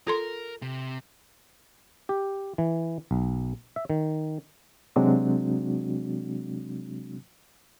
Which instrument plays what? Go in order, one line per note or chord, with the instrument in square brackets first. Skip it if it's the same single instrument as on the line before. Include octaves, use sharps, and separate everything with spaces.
[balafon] F4 A4 C6 [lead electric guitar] A#4
[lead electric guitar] C3
[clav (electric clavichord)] G4
E3
B1
E5
D#3
[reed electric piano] C3 F#3 G#3 C4 D4 F#4